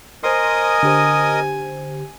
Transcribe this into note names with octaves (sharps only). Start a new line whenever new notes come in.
A#4 C5 D#5 G#5 C6 D#6
D3 G4 C5